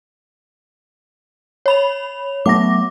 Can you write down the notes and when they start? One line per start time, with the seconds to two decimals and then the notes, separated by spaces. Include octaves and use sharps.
1.66 C#5 B5 F7
2.46 F#3 A3 B3 D6 A#6